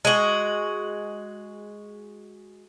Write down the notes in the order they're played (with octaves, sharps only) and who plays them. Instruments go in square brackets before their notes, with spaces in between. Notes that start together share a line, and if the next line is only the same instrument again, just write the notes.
[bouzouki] G#3 F#4